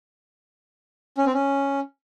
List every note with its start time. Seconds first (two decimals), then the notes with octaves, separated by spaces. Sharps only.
1.18 C#4
1.26 C4
1.34 C#4